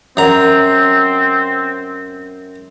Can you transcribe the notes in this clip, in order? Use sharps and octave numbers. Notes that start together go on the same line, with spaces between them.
F#2 C4 A#5